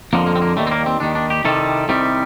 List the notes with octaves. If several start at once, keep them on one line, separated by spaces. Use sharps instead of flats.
F2 D3 F3 A#3
A#3
C4
A#3
D#2 D#3 G3 A3
C4
A#3
C4
D#2 D#3 G3 D4
D4
G4
C2 C3 D#3 G3 A4
C2 C3 D#3 G3